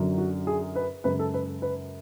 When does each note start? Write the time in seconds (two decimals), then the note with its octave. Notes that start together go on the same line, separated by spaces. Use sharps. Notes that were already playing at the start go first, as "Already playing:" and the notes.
Already playing: F#2 D3 F#3
0.18 F#4
0.47 G#4
0.76 B4
1.04 F#2 C#3 G#3 B4
1.19 A4
1.34 B4
1.62 B4